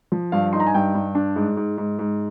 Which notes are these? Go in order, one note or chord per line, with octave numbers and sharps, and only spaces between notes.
F3
G2 F5
D#4 C6
A#5
G#5
G2 G5
G2
D4
G#2
G#2
G#2
G#2